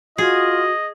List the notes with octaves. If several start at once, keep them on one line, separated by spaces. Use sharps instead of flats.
F4 F#4 G#4 D#5